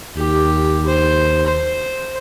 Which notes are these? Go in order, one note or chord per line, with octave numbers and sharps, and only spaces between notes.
D#2 G4
C5
C5